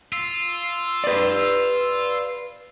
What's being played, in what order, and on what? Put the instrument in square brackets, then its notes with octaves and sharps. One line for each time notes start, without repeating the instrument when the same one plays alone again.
[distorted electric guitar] F4 [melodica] E6
[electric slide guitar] B4 D5